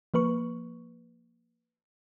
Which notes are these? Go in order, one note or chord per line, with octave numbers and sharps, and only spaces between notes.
F3 A#3 B4 C#6